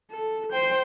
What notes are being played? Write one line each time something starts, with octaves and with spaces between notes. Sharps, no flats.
A4
C5 G5